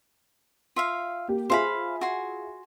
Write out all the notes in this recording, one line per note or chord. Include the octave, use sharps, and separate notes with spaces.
F4 E5 F5
A#3 G4
F4 G#4 C5 E5 F5 B5
F#4 G#5 C6